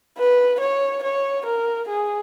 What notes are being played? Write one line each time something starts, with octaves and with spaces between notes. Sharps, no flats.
B4
C#5
C#5
A#4
G#4